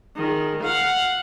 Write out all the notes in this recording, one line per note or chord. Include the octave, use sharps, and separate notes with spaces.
D#3 G#4
F5 F#5